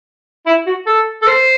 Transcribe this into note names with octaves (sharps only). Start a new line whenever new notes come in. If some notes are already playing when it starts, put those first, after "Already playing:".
E4
F#4
A4
A4
C5